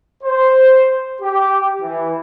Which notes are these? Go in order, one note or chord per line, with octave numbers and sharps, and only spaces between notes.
C5
G4
E3